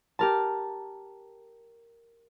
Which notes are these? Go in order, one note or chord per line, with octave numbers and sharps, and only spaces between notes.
G4 A#4 A5